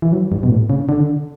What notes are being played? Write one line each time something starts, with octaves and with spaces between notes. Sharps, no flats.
E3
F#3
G2
B2
A2
C#3
D3